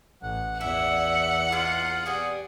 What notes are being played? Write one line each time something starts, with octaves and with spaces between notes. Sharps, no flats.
A1 F#5
E2 D4 E4 E5 F#5
G#3 A#3 E4 F4
G3 B3 C4 G#4